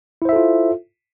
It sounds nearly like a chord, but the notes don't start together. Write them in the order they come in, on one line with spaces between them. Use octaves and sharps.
E4 C5 E5 A4 F4